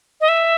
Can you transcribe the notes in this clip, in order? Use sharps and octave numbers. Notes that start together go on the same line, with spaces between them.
D#5
E5